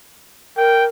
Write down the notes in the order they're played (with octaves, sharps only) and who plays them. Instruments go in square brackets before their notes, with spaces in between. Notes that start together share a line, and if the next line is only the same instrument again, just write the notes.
[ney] A#4 [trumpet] G5